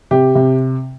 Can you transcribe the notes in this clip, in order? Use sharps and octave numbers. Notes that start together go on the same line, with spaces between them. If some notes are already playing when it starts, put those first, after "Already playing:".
C3 G4
C3